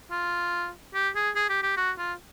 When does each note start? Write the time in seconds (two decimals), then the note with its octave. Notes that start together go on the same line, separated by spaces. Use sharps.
0.11 F4
0.94 G4
1.16 G#4
1.36 G#4
1.50 G4
1.63 G4
1.77 F#4
1.98 F4